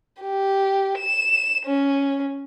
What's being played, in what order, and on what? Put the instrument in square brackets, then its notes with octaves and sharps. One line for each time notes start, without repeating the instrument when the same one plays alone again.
[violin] G4
E7
C#4